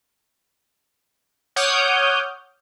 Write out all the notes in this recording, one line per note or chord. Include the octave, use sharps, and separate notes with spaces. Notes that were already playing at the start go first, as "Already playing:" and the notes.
C#5 F#5 D6 D#6 F6 G6